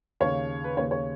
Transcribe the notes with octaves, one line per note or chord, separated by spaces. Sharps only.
D#2 C#3 C#5 F5
B4
D#2 C#3 C#5
C#5